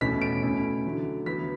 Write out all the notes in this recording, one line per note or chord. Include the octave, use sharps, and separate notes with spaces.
E2 B2 A3 C#4 E4 B6
D7
B2 A3 C#4 E4
D3 F#3 A3
D3 F#3 B3 E4 B6